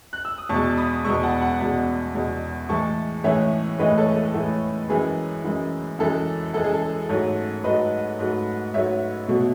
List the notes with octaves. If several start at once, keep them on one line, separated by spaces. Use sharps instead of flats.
F#6
E6
D#6
E2 B2 G#3 A5 C#6
B5 D#6
E2 B2 G#3 C#6 E6
F#5 A5
F#5 A5
E2 B2 G#3
E2 B2 G#3
A2 E3 G#3 A5 C#6
A2 E3 G#3 C#5 E5
A2 E3 G#3 B4 D#5
A4 C#5
A4
A2 E3 G#3
F#2 E3 G#3 G#4 B4
F#2 E3 G#3
F#2 E3 G#3 A4
F#2 E3 G#3 A4
G#4
A4
G#2 F#3 A3 A4 C#5
G#2 F#3 A3 B4 D#5
G#2 F#3 A3
G#2 F#3 A3 C#5 E5
B2 F#3 A3